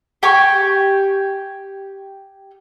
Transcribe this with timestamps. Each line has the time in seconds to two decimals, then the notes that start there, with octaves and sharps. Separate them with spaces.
0.23 G4 G5 G#5 C#6